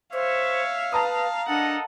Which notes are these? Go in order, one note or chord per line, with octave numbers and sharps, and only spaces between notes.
C5 C#5 E5 F5
B4 A5 A#5 D#6
D4 A4 A#4 D#5 F#5